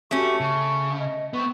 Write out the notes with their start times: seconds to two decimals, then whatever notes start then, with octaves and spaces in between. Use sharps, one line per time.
0.11 A3 C#4 F#4 G4 C#6
0.40 C#3 C#6
1.00 D#5
1.33 B3 C4 C#6